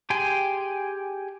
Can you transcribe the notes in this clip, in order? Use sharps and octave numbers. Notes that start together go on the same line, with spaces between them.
G4 G#4 G5 G#5 C6